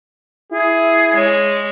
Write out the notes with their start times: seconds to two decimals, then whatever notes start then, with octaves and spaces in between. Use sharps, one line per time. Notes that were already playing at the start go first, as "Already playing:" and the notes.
0.52 E4 G#4
1.13 G#3 C#5